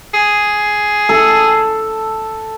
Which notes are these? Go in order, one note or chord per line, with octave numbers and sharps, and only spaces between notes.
G#4
A4